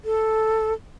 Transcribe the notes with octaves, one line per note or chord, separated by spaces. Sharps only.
A4